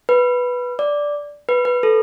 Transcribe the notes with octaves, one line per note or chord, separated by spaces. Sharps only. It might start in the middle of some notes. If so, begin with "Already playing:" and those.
B4
D5
B4
B4
A4